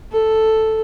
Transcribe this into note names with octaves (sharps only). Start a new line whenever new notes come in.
A4